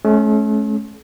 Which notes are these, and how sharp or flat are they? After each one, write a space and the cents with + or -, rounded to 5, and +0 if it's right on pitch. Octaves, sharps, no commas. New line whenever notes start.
A3 -40 C#4 -10